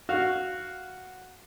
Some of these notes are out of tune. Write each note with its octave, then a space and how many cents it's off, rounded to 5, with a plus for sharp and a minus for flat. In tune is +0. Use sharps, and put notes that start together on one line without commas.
F#4 +0 F5 +0